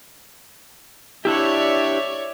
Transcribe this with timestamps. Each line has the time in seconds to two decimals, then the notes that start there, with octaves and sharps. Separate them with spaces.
1.25 D4 E4 G4 C#5 D5 E5